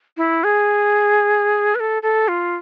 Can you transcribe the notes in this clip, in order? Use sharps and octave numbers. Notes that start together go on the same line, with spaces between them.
E4
G#4
B4
A4
A4
F4